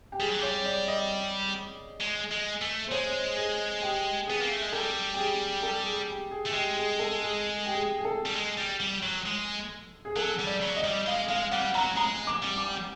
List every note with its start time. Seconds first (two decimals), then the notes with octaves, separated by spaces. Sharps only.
0.12 G4
0.20 G3 G#4
0.29 F#3
0.39 G3 C#5
0.65 D5
0.88 D#5
2.01 G#3
2.32 G#3
2.61 A3
2.88 C5
2.92 G#3 C#5
3.37 G#4
3.82 G4
4.27 B3 G#4
4.41 A#3
4.51 A3
4.62 G#3
4.72 G3 A4
5.14 G4
5.18 G#4
5.63 A4
5.86 G#4
6.09 G4
6.31 G#4
6.46 A3
6.54 G#3 G4
6.77 G#4
6.99 A4
7.22 G#4
7.66 G4
7.75 G#4
7.98 G#4
8.05 A4
8.25 G3
8.35 G#3
8.58 G3
8.80 G3
9.03 F#3
9.26 G#3
10.05 G#4
10.16 F#3 A4
10.39 G3
10.47 D5
10.61 F#3
10.76 D#5
10.84 G3
11.06 G#3 F5
11.29 G#3 F5
11.52 G3 F#5
11.75 F#3 A#5
11.97 G#3 A#5
12.27 D6
12.42 G3
12.58 D6